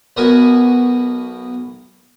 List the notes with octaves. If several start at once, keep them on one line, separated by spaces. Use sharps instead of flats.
B1 B2 B3 F#4 A#4 G#5